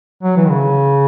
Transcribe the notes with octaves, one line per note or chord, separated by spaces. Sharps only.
F#3
E3
D#3
C#3